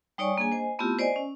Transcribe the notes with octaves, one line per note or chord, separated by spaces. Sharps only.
G3 D#4 C#5 D5 G#5 C#6
A#3 D4 G#4 G#5
C5 D#5 G#5
A3 B3 C4 E4 F4 G4
C5 D5 D#5 G#5
C#4